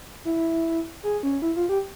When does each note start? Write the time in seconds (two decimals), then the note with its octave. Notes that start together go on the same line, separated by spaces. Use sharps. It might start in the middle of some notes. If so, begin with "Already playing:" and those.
0.25 E4
1.03 G#4
1.23 C#4
1.42 E4
1.56 F4
1.69 G4